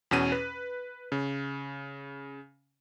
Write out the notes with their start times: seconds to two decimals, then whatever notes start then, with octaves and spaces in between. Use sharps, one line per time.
0.11 E2 B2 C#4 D#7
0.32 B4
1.12 C#3